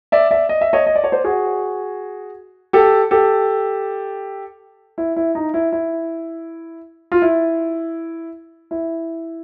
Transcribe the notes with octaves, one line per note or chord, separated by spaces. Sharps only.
D5 E5
D5 E5
D#5
E5
C#5 D#5
D#5
D5
C#5
C5 D5
F#4 G#4
G4 A4
G4 A4
E4
E4
D#4
E4
E4
F4
E4
E4